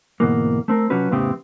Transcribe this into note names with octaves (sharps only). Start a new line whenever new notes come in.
D2 G#2 B2 E3 A#3
A3 C4 A#4
C3 F3 F#3 C#4 F#4 B4
F2 A2 C#3 B3 C4 G4